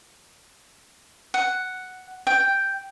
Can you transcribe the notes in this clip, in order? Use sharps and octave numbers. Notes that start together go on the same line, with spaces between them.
F#5
G5